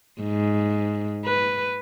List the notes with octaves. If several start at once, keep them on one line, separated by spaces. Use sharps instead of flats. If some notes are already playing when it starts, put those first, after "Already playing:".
G#2
B4